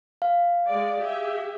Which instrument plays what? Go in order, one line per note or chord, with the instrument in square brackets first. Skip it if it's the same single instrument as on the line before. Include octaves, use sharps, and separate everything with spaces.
[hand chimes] F5
[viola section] G#3 D5
G4 G#4 E5